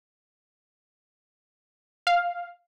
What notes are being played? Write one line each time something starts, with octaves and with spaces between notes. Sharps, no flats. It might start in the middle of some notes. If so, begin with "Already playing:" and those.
F5